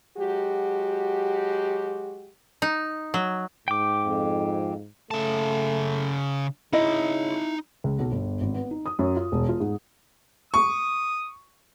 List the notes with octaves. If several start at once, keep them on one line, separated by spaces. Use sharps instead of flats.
F#3 G#3 F#4 G4
D#4
F#3
G#2 G5 D6
F2
C#3 A3 A5
C#3 D#4 E4 D#5 B5
C#2
B1
G1
G#1
B3
D#4
D#6
F#2
F4
E1
F4
G#2
C#6 D#6